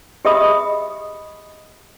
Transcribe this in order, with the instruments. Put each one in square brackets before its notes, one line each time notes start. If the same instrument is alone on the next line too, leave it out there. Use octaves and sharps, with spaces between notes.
[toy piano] G4 G#4 D#5 E5 B5 D#6